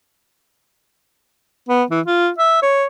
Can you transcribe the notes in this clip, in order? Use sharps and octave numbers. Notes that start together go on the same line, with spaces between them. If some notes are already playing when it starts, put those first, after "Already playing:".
B3
E3
F4
E5
C#5